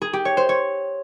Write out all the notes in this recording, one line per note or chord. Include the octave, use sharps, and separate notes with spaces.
G#4
G4
C#5
C5
C#5